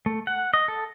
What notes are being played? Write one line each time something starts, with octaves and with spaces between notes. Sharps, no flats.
A3
F#5
D#5
A4